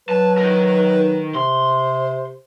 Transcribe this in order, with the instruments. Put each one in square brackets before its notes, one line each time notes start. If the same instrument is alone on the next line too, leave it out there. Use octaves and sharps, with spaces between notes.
[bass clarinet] F#3 [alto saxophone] B4 [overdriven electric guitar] A5
[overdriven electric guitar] D#3 A#4
[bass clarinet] C3 [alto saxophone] C5 [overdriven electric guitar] C6